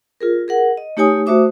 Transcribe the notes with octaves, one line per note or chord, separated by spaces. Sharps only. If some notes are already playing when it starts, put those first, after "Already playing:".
F4 G#4 A#4
G#4 A#4 F#5
D#5
A3 D#4 G4 C#5 G#5 D#6
A3 F#4 C5 E5 D6 D#6